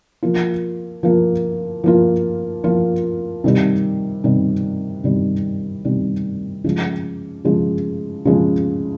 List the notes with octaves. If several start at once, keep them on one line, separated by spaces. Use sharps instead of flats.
F3 A#3 F4
F3 A#3 F4
F3 A#3 F4
F3 A#3 F4
C3 D#3 G3
C3 D#3 G3
C3 D#3 G3
C3 D#3 G3
C#3 F3 G#3
C#3 F3 G#3
C#3 F3 G#3